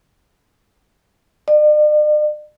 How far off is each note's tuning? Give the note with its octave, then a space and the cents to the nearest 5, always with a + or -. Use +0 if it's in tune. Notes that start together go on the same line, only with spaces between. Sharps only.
D5 +45